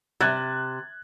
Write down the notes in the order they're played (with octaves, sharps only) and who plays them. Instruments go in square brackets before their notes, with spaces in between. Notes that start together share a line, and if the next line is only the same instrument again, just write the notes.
[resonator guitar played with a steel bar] C3 [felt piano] F#6 G#6 A6